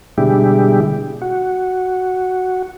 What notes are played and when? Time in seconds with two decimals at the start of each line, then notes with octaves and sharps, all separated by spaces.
0.18 B2 D3 G3 G#3 E4 G4
1.22 F#4